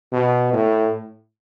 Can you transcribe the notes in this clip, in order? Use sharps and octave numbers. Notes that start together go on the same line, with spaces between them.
B2
A2